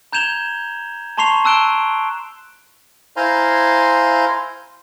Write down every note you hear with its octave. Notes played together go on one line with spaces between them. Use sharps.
A#5 G6 G#6 E7 F7 G7
A5 A#5 C6 C#6 C7 F7
A5 E6 F#6 D7 E7 G7
E4 C5 F5 G#5 A#5 C6